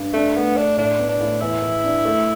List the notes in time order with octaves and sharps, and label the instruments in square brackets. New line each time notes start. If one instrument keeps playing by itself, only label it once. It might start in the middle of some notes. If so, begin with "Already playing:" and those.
Already playing: [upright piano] G2
[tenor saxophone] A3 [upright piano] D4
[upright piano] A3 [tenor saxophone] B3
[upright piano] A3 [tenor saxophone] D4
[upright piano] A2 [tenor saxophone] D4
[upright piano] B3
[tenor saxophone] D4
[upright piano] A2
[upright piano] E2 [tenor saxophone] E4
[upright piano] E2
D4
A3